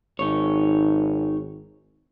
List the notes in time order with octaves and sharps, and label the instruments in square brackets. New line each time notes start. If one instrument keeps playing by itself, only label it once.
[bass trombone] G#1 [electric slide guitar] D#4 C#5